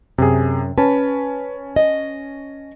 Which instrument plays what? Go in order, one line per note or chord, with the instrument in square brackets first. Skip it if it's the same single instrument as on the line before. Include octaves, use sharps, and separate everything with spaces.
[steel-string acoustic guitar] F#2 [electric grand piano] C3 G#4
[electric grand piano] C#4 A5 [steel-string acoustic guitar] B4
[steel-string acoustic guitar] D#5